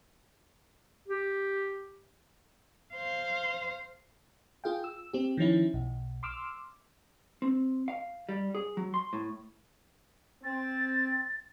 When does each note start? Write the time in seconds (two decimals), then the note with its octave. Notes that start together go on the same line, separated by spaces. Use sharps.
1.08 G4
2.95 C5 F5
4.64 F4 G#4 F5 G5
4.84 E6
5.13 C4 G4
5.37 D#3 F3 C#4 E4
5.74 B1
6.23 C6 D6 E6 F6
7.42 C4
7.88 F5
8.29 G3
8.55 G#4
8.77 F#3
8.94 C6
9.13 A2
10.44 C4 A6